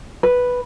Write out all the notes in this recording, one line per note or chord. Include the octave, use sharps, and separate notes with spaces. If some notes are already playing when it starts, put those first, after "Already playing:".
B4